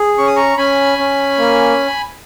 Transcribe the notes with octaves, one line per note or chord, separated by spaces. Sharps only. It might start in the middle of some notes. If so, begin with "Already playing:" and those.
Already playing: G#4
C#4 C#6
D#6
A#5 C#6
C#4 G#5 B5
C#4
A#3